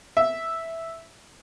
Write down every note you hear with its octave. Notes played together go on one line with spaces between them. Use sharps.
E5